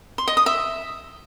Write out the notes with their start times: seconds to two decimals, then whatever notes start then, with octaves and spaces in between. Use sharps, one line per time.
0.18 C6
0.28 D#5
0.37 D#6
0.46 E5